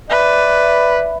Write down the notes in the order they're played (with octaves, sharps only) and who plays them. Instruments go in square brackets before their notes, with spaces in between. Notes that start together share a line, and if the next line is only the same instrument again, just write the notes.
[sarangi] B4 [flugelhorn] D5 [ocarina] E5